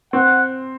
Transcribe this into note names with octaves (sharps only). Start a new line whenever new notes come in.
C4 F#5